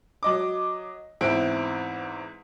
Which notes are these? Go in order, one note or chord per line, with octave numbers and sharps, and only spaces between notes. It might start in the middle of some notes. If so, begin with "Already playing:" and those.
F#3 D#5 D6
E2 G#2 C4 E4 D7